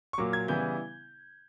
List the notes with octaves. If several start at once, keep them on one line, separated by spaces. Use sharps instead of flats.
C#6
A#2 F#3 A#3 D6
G#6
C#3 E3 G3 B3 E4 G6